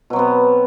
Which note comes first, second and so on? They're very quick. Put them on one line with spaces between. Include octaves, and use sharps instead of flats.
B2 F#3 C4 B3